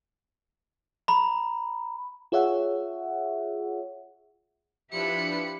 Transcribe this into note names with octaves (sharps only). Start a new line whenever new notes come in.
A#5 B5
F4 G#4 C#5 E5 F#5
F3 D4 E4 G4 B4 B5 C#7